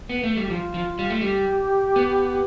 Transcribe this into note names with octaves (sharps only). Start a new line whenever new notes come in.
B3
A3
G3 G4
F3 F4
F3
G3
A3
G3 G4
B3